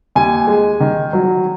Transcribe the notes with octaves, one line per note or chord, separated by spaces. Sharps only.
D#2 G#5
G#3
D#3
F#3